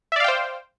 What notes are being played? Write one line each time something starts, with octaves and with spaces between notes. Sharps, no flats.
C5 D5 E5 F5 G5